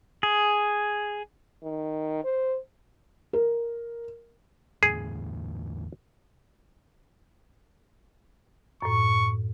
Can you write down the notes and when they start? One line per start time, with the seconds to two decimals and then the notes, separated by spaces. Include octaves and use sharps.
0.23 G#4
1.63 D#3
2.24 C5
3.33 A#4
4.83 E2 A2 D3 G#4
8.82 F#2 A2 C#6